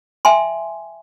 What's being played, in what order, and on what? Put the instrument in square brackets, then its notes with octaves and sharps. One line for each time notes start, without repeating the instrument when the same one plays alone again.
[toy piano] E5 G5 G#5 C6